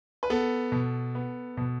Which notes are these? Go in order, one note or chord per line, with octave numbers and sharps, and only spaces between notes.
B4
B3 A4
B2
B3
B2